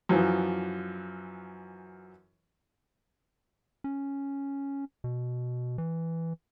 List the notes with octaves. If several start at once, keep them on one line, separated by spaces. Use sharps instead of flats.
F#2 E3 F3
C#4
B2
E3